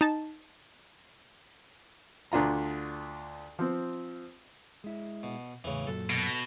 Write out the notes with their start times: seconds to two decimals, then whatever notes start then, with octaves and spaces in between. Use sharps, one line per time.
0.01 D#4 A5
2.32 D2 D4 F4 A#5
3.59 F3 C4
4.84 G#3 E4
5.23 B2
5.64 E2 A2 C#3 E3
5.87 F#2 A#2 F#3 A4
6.10 B2